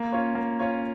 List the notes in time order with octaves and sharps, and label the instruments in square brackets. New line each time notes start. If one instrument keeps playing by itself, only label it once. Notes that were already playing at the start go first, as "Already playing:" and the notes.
Already playing: [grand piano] A#3
C#4 F4 C#5
A#3
C#4 F4 C#5